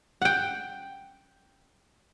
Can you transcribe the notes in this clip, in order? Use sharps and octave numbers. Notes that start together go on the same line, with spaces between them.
F#5 G5